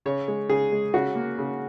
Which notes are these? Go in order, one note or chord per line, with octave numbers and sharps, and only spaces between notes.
C#3 C#5
G#3
C#3 G#4
G#3
C#3 F#4
A#3
C#3